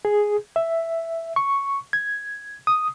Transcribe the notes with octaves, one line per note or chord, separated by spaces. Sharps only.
G#4
E5
C#6
G#6
D#6